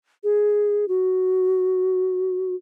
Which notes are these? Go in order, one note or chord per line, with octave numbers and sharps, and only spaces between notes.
G#4
F#4